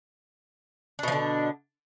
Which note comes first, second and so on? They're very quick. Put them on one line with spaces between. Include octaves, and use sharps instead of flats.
D4 B2 F3 D3